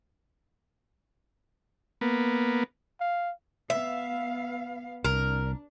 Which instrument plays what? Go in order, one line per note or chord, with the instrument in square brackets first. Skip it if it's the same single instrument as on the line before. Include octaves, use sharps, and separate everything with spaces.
[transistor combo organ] A#3 B3
[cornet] F5
[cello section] B3 F5 [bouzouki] E5
[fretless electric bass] C2 [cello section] D4 [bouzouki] A#4